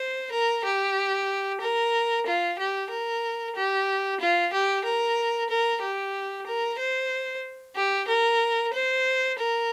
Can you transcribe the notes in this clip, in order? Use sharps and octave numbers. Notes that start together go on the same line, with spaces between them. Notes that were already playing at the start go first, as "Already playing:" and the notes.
Already playing: C5
A#4
G4
A#4
F4
G4
A#4
G4
F4
G4
A#4
A#4
G4
A#4
C5
G4
A#4
C5
A#4